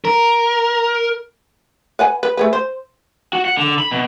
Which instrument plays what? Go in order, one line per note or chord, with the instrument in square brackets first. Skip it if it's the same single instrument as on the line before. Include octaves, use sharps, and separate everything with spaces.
[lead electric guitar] A#4
[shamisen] B4 F#5 G#5
B4
A3 G#4 B4
C5
[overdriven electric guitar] F#4
F#5
D3
B5
B2